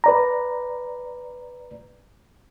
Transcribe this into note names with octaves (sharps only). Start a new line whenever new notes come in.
B4 D5 A#5